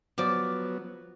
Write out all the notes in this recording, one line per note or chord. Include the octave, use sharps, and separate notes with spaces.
F3 F#3 B3 D5